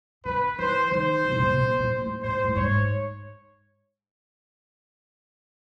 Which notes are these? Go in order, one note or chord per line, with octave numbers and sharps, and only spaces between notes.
D3 B4
E3 C5
D#3 C5
C#3
C3
B2
C3
B2
A#2
A2
A2 C5
A2
G#2 C#5